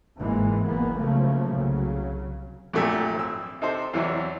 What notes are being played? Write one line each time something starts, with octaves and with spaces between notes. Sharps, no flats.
G1 G#2 E3 G#3 A#3
F#1 C#2 A#3 B3
C#3 F3 F#3 A3 A#3
C2 C#3 F#3
A#1 F#2 A#2 A3 G4 E5
G#1 E6
C3 D#4 A4 C5
E2 C3 E3 F#3